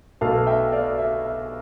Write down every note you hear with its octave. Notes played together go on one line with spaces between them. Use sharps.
B1 B2 A3 F5 A5
E5 G5
D5 F5
E5
E5